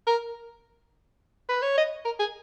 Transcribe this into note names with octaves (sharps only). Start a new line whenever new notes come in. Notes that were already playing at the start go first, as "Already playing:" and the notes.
A#4
B4
C#5
D#5
A#4
G#4